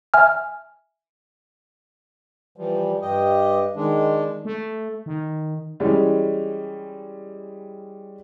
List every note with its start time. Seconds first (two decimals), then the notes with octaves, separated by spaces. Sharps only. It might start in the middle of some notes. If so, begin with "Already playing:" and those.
0.14 E5 G#5 F6
2.56 E3 F3 G3
3.02 G2 G4 D#5
3.76 D#3 G#3 D4
4.45 A3
5.06 D#3
5.80 E3 G3 G#3 C#4